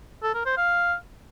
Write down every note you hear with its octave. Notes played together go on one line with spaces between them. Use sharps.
A4
A#4
C5
F5